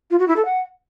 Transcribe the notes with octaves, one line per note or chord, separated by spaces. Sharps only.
F4
F#4
E4
A4
F#5